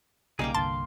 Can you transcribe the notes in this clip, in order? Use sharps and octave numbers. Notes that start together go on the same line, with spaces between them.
B1 C#3 G3 A#3 D#4 G#4 F5 G5
G1 C2 D3 A5 C6